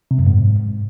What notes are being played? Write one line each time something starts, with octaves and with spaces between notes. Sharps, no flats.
C3
F#2
G#2